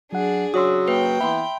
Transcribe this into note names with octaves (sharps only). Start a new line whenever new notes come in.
F#3 D4 G#4 F#5
C#3 F#3 F#4 C#5 C6 D#6 E6
A#3 B4 G5 G6
E3 B3 E5 B5 C6